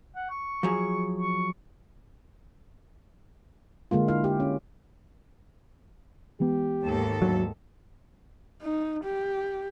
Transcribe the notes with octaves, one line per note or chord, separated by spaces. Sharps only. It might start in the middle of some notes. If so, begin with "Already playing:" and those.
F#5
C#6
F3 F#3 G#4
C#6
D3 G#3 A#3 F4
E4 F5
G4
C#4
E3 G#3 B3 G4
D#2 G#2 A4
D2 F#3
D#4
G4